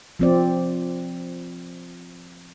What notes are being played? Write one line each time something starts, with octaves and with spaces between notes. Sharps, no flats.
F3 C4 D5